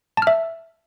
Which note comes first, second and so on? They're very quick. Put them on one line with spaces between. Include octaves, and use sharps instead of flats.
A5 F6 E5